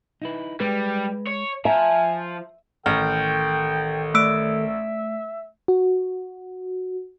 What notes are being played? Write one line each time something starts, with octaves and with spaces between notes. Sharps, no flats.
D#4 E4 B4
G3 G#3 B4
C#5
F3 E5 G#5 A#5
A1 D#3 A4 G5 F6
A3 E5 E6 D7
F#4